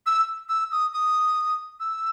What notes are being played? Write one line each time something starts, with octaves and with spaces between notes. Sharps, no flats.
E6
E6
D#6
D#6
E6